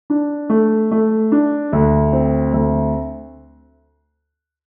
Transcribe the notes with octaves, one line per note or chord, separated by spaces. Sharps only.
D4
A3
A3
D4
D2
C4
D2